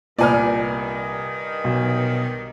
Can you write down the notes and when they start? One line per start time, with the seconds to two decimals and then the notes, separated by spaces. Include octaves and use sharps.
0.19 C2 G2 A#2 D#3 B4 D5 G#5 F6
1.64 B1